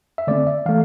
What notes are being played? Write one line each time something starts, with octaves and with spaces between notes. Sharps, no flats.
E5
D3 A3 C4 D5
E5
E3 A3 F5